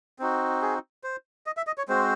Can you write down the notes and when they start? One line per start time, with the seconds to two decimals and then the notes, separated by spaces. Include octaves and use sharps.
0.19 C4 D#4 F#4
0.62 G#4
1.04 C5
1.46 D#5
1.57 E5
1.67 D#5
1.78 C#5
1.88 G#3 C4 F#4 C5